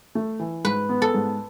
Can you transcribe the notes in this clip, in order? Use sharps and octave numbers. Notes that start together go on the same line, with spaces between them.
A3
E3
G#2 B4
B3
A4
G#2